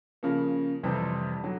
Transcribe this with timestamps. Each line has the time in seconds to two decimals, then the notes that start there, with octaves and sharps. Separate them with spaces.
0.23 C#3 F3 A#3
0.83 F2 C3 E3 G3 C4
1.43 D3 F#3